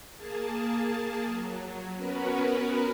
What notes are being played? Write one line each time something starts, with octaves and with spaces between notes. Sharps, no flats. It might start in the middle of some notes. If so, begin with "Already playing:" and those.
A#3 G#4 A5
F#3
B3 C#4 F#4 A#4 B4